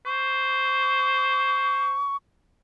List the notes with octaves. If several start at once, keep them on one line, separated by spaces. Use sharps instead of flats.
C5 C#6